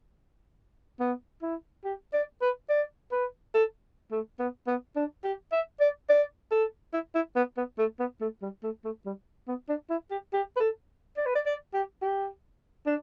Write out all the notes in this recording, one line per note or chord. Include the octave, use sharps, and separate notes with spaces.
B3
E4
G4
D5
B4
D5
B4
A4
A3
B3
B3
D4
G4
E5
D5
D5
A4
E4
E4
B3
B3
A3
B3
A3
G3
A3
A3
G3
B3
D4
E4
G4
G4
B4
A4
D5
B4
D5
D5
G4
G4
D4